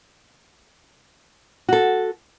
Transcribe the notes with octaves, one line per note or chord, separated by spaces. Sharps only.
F#4 A4